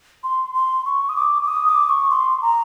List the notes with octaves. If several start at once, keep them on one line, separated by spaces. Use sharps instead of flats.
C6
C6
C#6
D#6
D6
D6
D#6
D6
C#6
C6
A#5